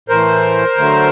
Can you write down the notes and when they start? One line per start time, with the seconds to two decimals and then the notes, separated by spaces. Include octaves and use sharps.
0.09 A2 E3 A3 A#4 C5
0.78 D3 F#3 A3